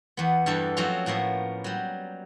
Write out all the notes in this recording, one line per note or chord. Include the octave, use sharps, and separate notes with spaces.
E2 B3
E2 G2 E3 G3 A4
F3 F#3 A3 C4 C#4 F4
A2 F3 A#3 B3
F#3 G3